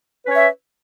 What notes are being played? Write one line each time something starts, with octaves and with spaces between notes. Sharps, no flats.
C#4 B4 C#5 E5